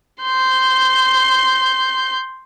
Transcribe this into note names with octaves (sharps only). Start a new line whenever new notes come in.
C6 G6